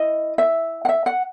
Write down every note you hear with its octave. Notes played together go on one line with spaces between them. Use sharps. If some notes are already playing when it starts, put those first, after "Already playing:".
Already playing: E4 D#5
E5
F#5
E5
F#5